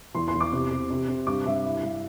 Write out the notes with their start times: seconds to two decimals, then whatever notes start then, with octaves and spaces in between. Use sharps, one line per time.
0.15 E2 C6
0.28 C6
0.34 E2
0.41 D6
0.52 C3
0.71 C3
0.90 C3
1.08 C3
1.27 G2 D6
1.46 G2 E5
1.65 E4
1.83 G2